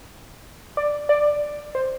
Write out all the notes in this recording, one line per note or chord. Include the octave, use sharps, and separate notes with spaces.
D5
D5
C5